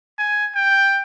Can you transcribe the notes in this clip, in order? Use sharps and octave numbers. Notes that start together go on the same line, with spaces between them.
G#5
G5